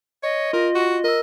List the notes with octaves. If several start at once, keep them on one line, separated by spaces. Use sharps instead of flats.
C#5 D#5
F4 A#4
F#4
A#4 D#5 E6